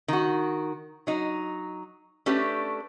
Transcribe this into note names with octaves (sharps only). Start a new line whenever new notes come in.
D#3 F#4
F#3 D#4
A3 C#4 D4 G4 B4